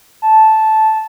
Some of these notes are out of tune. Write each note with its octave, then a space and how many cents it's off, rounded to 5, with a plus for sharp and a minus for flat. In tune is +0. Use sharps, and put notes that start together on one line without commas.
A5 -10